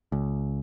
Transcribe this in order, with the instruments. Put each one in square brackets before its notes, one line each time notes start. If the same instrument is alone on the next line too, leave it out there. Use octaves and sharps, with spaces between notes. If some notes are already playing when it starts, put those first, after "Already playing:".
[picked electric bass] C#2